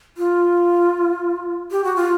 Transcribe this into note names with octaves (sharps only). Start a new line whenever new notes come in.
F4
G4
F#4
F4